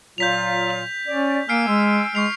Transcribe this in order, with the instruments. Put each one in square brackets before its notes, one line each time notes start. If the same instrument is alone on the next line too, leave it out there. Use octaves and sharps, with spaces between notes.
[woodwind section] A#2 F#3 F4 [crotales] G6 B6 F7
[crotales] F7
[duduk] C#4 [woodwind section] D5
[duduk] A#3 [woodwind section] G#5 E6 [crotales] F6 C7 D7
[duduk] G#3
[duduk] G#3 [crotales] C#6 C7 F7